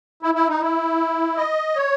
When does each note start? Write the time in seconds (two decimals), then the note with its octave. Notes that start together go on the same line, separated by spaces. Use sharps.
0.23 E4
0.35 E4
0.48 D#4
0.61 E4
1.37 D#5
1.76 C#5